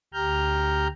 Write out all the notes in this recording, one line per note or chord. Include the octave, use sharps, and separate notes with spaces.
D2 G4 A#5 F6 G6